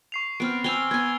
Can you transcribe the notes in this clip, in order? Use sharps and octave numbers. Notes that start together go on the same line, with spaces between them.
C#6 C7 F7
B3 C4 F6 D7
C4 G#5 E6 F7 G7
B3 G#5 G#6